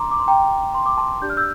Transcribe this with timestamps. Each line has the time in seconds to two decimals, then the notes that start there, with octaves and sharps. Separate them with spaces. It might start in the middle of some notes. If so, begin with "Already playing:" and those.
Already playing: D4 A#5 C6 D6
0.11 D6
0.20 C6
0.28 G5 A#5
0.75 C6
0.86 D6
0.98 A5 C6
1.22 D4 G4 D5 G6
1.30 F6
1.37 E6 G6